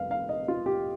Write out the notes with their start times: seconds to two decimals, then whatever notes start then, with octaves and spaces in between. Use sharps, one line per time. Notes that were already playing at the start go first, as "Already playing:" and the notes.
Already playing: F1 F2 G3 B4 F5
0.11 F5
0.29 D#5
0.48 F4
0.66 G4